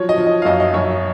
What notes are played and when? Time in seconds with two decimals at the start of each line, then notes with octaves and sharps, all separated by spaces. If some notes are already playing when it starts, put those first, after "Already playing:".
Already playing: F3 F#3 C#5
0.09 D#5
0.18 F3
0.26 D#5
0.42 F5
0.45 F#2 D#5
0.60 D#5
0.74 F#2 C#5